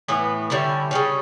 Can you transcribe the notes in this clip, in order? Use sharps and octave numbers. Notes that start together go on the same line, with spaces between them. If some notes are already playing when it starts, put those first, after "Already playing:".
A2 E3 B3
D3 G3 C#4 E4
C#3 G3 C#4